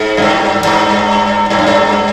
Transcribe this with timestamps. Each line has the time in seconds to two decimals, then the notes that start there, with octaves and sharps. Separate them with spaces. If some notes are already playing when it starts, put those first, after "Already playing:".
Already playing: G#2
0.17 F#2
0.22 G2
0.65 G2
1.50 G2
1.59 F#2
1.67 G2